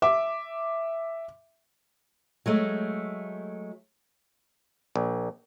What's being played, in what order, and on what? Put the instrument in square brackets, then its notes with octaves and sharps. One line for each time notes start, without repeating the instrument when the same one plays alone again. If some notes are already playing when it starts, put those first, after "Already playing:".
[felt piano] E5 D6
[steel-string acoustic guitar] F#3 G#3 A3
[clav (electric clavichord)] A#1